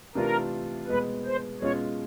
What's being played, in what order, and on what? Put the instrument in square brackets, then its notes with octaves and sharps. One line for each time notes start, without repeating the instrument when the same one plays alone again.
[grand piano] C3 E3 A3 D4 F4 [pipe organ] A#4
[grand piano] B2 G#3 B3 [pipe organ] B4
[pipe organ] C5
[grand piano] B2 G#3 C#4 F4 [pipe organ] C#5